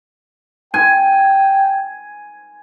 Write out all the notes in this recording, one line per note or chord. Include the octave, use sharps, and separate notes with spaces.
G5 G#5